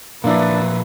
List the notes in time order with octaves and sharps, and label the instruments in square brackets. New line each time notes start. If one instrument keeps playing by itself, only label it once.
[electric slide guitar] A#2 F3 F#3 [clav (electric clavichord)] A#3 E4 [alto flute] D4 [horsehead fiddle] B4 E5